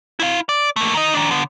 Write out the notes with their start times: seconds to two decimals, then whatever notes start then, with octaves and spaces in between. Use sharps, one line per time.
0.20 E4 F5
0.49 D5
0.76 A3 A#3
0.94 D#3 D#5
1.14 D#3 D4
1.31 D3 B3